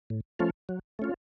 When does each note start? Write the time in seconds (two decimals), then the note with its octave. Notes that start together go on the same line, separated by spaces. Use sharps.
0.10 A2
0.39 F3 A3 C#4 F4
0.69 F#3
0.99 A3 C#4 F4